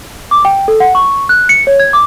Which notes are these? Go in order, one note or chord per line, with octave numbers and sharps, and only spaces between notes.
D6
G5
A4
F#5
C#6
F#6
C#7
C#5
G#6
D6